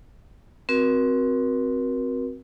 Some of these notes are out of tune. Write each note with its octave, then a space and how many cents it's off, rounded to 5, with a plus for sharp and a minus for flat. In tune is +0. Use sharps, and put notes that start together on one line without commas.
C4 +0 F#4 +0 A#4 +35